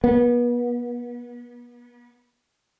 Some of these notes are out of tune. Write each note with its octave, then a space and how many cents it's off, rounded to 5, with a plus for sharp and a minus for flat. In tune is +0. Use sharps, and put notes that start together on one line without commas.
B3 -35